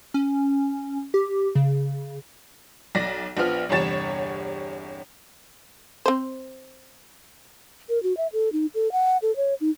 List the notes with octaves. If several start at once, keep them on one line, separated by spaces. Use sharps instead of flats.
C#4
G4
C#3
B1 D5 A#6 B6
A#1 F3 B3 F6
G1 E2 C3 C#5 A6 E7
C4 C5
A#4
F#4
E5
A4
D#4
A4
F#5
A4
C#5
D#4